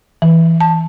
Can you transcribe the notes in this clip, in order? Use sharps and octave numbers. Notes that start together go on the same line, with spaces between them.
E3
A5